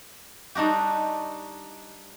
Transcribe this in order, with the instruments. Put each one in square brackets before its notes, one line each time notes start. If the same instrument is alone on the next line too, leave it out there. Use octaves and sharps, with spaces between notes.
[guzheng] G3 D4 D#4 F#4 G4